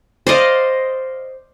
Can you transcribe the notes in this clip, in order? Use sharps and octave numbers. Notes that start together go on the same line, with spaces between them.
C5 D5 D#5 F5